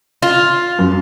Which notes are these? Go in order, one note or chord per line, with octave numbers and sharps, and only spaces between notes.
F4
F#2